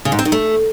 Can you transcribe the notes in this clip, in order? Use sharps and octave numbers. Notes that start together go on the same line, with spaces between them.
C#3
G#2
C4
D#3
A3